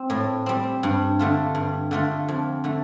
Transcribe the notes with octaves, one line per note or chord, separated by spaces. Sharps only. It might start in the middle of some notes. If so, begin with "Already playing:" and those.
Already playing: C4
A2
G3 C4
G2
D3 A3 F4
G2
D3 A3 F4
F2
D3 A3